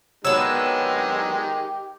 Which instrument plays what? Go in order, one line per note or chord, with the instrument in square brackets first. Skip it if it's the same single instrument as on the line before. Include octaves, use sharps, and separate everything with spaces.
[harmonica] D#3 G#3 D#4 [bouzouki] F#3 B3 D4 [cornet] G4 [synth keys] E6